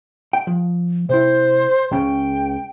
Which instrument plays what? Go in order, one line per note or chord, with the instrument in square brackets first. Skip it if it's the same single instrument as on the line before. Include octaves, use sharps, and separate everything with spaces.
[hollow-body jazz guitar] G5
F3
[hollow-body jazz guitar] C3 E4 [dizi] C5
[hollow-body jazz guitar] C#2 C#3 [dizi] G5